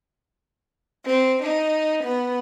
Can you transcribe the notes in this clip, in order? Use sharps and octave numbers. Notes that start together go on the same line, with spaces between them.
C4
D#4
B3